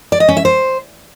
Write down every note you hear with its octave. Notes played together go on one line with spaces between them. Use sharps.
D5
D#5
C#4
E5
C5